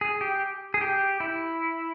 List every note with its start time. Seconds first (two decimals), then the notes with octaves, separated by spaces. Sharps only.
0.01 G#4
0.21 G4
0.74 G#4
0.81 G4
1.20 E4